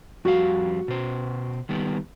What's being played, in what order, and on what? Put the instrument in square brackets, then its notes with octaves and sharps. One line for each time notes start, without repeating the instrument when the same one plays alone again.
[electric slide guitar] F2 G3 F5 [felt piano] F#4
[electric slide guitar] B2 C5
D#3 G3 B3